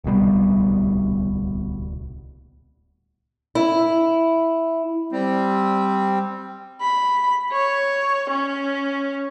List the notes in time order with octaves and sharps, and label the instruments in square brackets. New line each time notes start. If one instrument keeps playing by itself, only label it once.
[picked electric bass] D1 C2 B2 G3
[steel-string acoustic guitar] E4
[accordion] G3 C4
[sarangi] B5
C#5
C#4